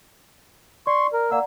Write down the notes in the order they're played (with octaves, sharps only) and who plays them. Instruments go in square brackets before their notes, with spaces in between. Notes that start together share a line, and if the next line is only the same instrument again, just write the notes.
[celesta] D5 [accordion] C6 C#6
[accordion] A#4
[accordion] A#3 E6 [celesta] D5 F#5 A#5